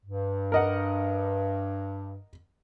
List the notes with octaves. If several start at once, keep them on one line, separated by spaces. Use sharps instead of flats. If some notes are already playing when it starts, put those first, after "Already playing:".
G2
A#4 D#5 F#5